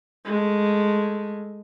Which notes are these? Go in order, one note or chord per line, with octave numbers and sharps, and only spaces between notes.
G#3 A3